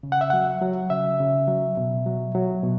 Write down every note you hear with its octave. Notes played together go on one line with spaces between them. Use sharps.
C#3
F#5
E5
F#3 F#5
F#3
C#3 E5
C#3
F#3
B2
F#3
F#3
B2